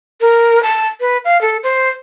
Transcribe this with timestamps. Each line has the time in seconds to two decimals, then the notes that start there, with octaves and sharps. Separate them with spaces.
0.21 A#4
0.63 A5
1.00 B4
1.25 F5
1.41 A4
1.63 C5